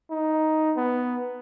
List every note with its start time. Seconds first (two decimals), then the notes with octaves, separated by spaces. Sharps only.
0.11 D#4
0.77 B3